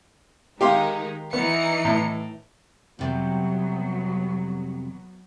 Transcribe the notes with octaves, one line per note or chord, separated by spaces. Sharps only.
D#3 G#3 D#4 G4 F5 C6
E3 B3 D#4 C#7
A2
F2 C3 F#3 G3 B3